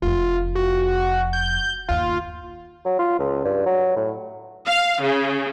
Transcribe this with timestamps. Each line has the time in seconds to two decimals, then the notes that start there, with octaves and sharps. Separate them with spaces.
0.02 F1 F2 F4
0.55 F#4
1.33 G6
1.89 G1 D#2 F4
2.85 F#3
2.99 F4
3.19 C#2
3.44 G2
3.66 F#3
3.96 A2
4.67 F5
5.04 C#3